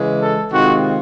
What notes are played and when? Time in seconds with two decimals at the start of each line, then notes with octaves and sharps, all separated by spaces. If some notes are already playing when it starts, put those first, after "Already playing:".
Already playing: C#3 E3 G#3
0.20 A4
0.52 C3 D#3 G#3 C4 F4 F#4